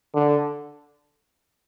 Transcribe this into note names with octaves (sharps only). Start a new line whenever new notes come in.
D3